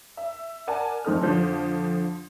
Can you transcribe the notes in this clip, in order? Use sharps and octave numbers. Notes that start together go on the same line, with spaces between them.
E5
A#4 D5 F#5 G#5 A5
F2 C4 D#4 A4 F6
F2 D3 F3